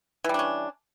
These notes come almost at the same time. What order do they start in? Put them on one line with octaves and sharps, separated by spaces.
E3 G3 D4 C#4